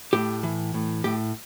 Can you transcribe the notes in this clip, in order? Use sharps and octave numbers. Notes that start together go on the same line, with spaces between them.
A2 G4
E3
A2
A2 G4